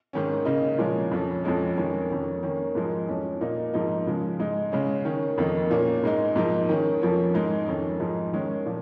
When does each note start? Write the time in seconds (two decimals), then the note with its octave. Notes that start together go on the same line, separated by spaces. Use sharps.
0.13 G#2 D#3 C#4
0.45 C#3 A#3 D#4
0.78 A#2 F3 G#3 C#4
1.11 F2 F3 C#4
1.44 F2 F3 G#3 C#4
1.77 F2 D#3 G#3 C#4
2.10 F2 D#3 C#4
2.43 D#3 A#3 C#4
2.75 G#2 F3 G#3 D#4
3.08 F2 F3 G#3 C#4
3.41 A#2 A#3 D#4
3.74 G#2 F3 A#3 D#4
4.07 C#3 F3 G#3
4.39 G#2 G#3 D#4
4.72 C#3 G#3 C#4
5.05 D#3 C#4
5.38 F2 D#3 A#3 D#4
5.70 A#2 A#3 C#4
6.04 G#2 G#3 D#4
6.36 G#2 F3 A#3 D#4
6.69 D#3 C#4
7.02 F2 F3 A#3 C#4
7.34 G#2 G#3 D#4
7.67 F2 D#3 C#4
8.00 G#2 F3 G#3 D#4
8.33 D#3 G#3 C#4
8.66 A#2 F3